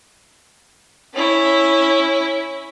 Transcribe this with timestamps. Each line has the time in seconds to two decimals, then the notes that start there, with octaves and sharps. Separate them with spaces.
1.14 C#4 E4